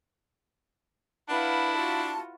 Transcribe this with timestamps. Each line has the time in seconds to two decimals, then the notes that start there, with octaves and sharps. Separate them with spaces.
1.29 D4 E4 B4 F5 F#5
1.75 F4 F#4 A5